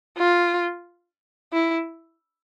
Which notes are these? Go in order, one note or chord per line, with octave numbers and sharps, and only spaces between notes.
F4
E4